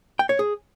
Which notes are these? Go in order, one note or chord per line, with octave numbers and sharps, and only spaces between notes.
G5
C#5
G#4